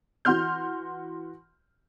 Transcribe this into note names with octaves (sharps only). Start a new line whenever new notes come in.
E3 F#4 C6 F6 G6